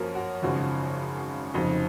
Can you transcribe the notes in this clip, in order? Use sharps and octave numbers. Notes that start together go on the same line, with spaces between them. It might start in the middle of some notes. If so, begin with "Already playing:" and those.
Already playing: F#2 F3 A#3 C#4 A#4
F#4
G#1 F#2 C#3 F3 F#4
F1 F2 C#3 F#3 C4 D#4